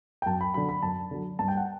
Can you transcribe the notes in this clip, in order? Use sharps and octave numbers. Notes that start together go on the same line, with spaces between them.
G5
F#2 A5
B5
D3 F#3 B5
B5
F#2 A5
D3 F#3
G2 A5
G5
F#5